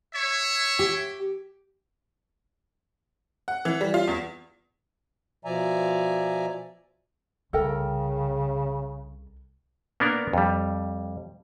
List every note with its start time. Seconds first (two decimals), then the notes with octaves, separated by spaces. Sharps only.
0.14 C#5 E5
0.79 G4
3.48 F#5
3.65 E3
3.81 G3
3.94 F4
4.07 E2
5.45 B2 F3 D5 E5 G#5 A#5
7.53 C2 C#3 A4 A#4 G5
10.00 A#3 B3 D4 A#4
10.33 F2 G3